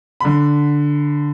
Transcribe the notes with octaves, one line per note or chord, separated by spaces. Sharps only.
D3 B5